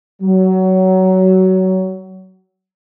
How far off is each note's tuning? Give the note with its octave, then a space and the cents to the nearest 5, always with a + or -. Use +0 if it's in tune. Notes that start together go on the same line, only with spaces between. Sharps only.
F#3 +20